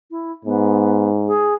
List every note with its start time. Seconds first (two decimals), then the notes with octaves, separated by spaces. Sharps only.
0.11 E4
0.45 G#2 B3
1.28 G#4